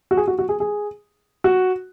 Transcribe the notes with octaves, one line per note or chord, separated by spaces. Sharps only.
F#4
G#4
F#4
F#4
G#4
G#4
F#4